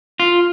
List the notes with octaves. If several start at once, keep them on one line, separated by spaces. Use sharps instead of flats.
F4